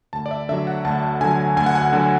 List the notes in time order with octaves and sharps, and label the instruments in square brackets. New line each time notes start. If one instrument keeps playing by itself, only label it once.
[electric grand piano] D2 A5
D5
E5
D3 E5
F#3
F#5
D2 A5
D3 F#3 G#5
D2 G#5
F#5
G#5
D3 F#3